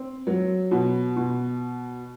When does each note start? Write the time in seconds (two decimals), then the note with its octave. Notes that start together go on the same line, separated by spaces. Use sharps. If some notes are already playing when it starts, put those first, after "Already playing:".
Already playing: C4
0.27 F#3
0.71 B2
1.16 B2